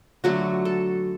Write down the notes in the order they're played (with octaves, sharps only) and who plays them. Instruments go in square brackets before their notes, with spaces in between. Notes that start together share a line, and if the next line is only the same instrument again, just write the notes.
[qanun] D3 F#3 A3 F#4
A4